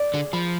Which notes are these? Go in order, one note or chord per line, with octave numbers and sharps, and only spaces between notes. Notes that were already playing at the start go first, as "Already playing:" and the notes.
Already playing: D5
D3 G#4
F3 B5